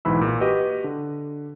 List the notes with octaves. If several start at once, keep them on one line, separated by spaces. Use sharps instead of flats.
B1 G#2 E3 B5 E6
A#2
F#4 G4 B4 D#5
D3